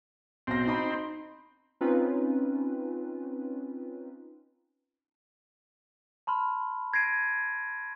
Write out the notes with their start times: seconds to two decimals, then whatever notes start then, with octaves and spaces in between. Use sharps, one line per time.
0.47 B1 C4 A#6
0.67 D#4 B5
1.81 C4 C#4 D#4 F4 B4
6.27 A5 B5 C6 F6
6.93 G#6 A#6 C7 D7 D#7